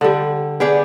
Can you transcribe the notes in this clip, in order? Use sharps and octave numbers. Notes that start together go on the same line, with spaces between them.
D3 G3
B3 G#4 D5 G5